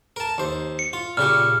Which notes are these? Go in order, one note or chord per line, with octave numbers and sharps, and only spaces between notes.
A#4 A5
D#2 C5
C#7
F4
A#2 C#3 G4 F6